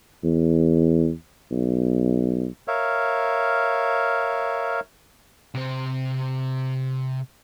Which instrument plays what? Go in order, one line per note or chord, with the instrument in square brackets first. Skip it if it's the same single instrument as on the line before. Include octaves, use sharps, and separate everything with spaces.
[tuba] E2
B1
[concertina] A#4 C#5 E5 F5
[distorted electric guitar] C3 C5